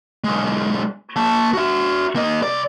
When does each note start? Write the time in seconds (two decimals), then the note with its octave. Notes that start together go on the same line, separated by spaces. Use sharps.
0.24 B1 G#3
1.16 A#3 A5
1.53 F#4 E5
2.16 A#3 D#5
2.43 C2 D5